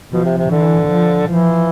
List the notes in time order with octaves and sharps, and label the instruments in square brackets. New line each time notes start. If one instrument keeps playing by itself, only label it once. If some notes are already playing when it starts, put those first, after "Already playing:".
[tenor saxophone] B2 [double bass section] F3
[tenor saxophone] C3
C3
[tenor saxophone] D3 [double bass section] E3
[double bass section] F3
[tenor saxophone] E3 [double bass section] F3